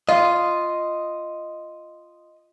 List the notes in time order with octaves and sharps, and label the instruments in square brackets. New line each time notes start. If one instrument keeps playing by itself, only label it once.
[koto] F4 [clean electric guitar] D#5